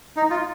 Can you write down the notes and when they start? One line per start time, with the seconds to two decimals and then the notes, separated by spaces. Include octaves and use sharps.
0.17 D#4
0.30 F4